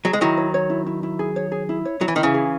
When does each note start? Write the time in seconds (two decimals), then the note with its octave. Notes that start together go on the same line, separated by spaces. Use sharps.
0.05 F#3 G#4
0.13 G#3
0.21 D#3 F#3 E4
0.37 C#5
0.54 C#5
0.70 E4
0.86 E4
1.03 E4
1.19 G#4
1.36 C#5
1.52 G#4
1.69 E4
1.85 C#5
2.01 F#3 E4
2.08 E3
2.16 D#3 E4
2.23 C#3 E3
2.34 G#4